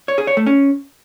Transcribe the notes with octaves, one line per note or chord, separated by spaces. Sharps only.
C#5
G#4
C#5
A3
C#4